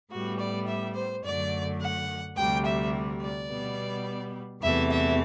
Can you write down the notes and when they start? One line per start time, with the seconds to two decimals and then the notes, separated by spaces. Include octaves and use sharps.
0.11 A2 G3 B3 F#4
0.39 D5
0.67 E5
0.95 C5
1.24 F#2 D3 F#3 A3 D5
1.81 F#5
2.36 D2 C3 G3 G5
2.65 E5
3.21 D5
3.49 B2 G3 B3
4.62 E2 C3 E3 A3 E5
4.91 E5